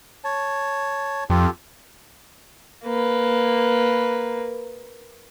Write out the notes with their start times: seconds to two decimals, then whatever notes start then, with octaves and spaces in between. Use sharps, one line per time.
0.24 C#5 A5
1.30 F2 F4 G4 A4
2.85 A#3 B4